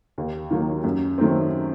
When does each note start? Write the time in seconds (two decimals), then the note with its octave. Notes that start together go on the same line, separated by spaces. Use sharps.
0.18 D#2
0.51 D#3 F#3 A#3
0.84 F#2
1.18 D#3 F#3 A3 C4